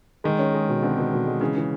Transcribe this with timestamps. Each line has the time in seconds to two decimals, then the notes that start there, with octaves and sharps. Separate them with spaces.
0.24 D#3 G#3
0.39 C#4
0.54 G#3
0.69 B2
0.83 D3 C4
0.98 B2
1.12 B2
1.26 G#3
1.41 C#3 E3
1.56 E3